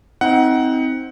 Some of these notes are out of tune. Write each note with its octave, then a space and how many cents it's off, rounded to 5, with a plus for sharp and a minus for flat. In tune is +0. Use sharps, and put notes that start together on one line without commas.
C4 +0 D#4 +30 F#5 +10